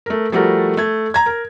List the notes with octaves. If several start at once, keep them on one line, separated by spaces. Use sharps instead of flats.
A3 A#4
F3 G3 A3 F#4 A#4
A3 G#6
A#5 G#6
A#4